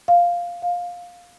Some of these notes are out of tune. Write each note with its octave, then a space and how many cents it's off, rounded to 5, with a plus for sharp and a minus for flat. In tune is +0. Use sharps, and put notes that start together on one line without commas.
F5 +0
F5 +15